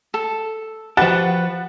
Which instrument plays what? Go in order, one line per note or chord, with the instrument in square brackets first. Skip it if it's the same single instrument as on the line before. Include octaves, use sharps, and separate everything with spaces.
[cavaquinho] A4
[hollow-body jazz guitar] F3 F#4 G4 [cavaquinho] B4 [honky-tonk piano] F#5 A6 E7